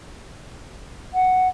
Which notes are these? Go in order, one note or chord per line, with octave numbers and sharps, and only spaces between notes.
F#5